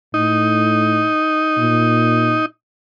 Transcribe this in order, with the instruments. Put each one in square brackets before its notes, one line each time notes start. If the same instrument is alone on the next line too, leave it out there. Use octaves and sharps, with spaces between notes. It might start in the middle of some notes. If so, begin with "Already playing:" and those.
[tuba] A2 [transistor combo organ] D#4
[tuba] A#2